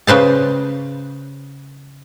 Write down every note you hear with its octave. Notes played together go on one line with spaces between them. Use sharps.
C#3 B4 C5 A5